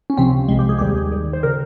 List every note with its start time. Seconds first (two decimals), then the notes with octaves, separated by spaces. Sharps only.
0.10 C#4
0.17 C#2 C3 F3 C4
0.48 C2 C3 F3 G#3
0.59 G4
0.69 G#4
0.78 D#2 D#3 G3 G4
0.88 G#4
1.11 G#2 D#3 G3
1.33 C5
1.43 C#3 G3 A#4